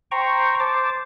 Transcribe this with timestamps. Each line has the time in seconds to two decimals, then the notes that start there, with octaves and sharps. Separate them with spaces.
0.11 C5 G5 A#5 C#6
0.60 C5 A5 D6